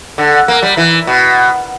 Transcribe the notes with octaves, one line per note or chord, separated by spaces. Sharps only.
D3
A#3
G3
E3
B2